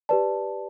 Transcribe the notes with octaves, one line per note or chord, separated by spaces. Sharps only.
G4 B4 D5 A5